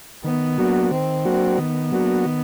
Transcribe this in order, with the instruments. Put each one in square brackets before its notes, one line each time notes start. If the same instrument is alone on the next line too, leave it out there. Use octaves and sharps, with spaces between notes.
[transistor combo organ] D#3 [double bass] B3
[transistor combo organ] F#3 A#3 D4 F#4
[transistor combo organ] D#3 [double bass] C4
[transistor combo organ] F#3 A#3 D4 F#4
[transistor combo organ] D#3 [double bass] B3
[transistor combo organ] F#3 A#3 D4 F#4
D#3